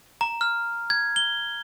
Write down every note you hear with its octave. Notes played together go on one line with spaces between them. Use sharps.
A#5
F6
G#6
G7